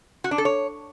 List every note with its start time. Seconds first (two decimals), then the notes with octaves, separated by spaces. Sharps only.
0.24 F#4
0.31 D4
0.38 A4
0.45 C#5